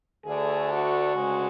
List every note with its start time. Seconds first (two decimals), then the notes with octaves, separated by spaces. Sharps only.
0.25 D2 D3 A3 G#4
0.70 F#4
1.14 D2 C#3 G#3